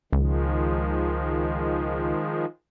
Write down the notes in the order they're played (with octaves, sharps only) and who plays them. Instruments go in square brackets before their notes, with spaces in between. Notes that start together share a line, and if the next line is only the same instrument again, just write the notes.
[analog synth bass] C#2 [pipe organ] D#3 F3 G#3